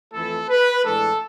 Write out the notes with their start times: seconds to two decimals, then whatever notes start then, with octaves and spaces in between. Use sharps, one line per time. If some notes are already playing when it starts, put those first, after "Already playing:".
0.11 F2 E3 A3 E4 A4
0.48 B4
0.84 A2 E3 G#3 D4 A4